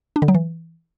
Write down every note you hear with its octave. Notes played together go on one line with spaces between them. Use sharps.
D4
D3
F#3
E3